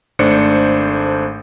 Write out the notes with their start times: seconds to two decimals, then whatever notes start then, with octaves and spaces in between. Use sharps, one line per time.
0.19 G#1 A3 D4 C5 C#7